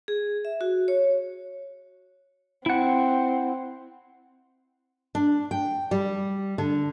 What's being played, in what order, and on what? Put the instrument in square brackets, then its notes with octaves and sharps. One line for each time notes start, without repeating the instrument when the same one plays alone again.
[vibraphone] G#4
E5
F#4
C#5
[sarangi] C4 [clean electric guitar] E4 F#5
[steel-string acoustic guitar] D4
G5
G3
D3